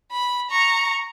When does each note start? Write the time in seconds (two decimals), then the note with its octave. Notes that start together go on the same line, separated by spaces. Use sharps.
0.12 B5
0.50 A#5 C#6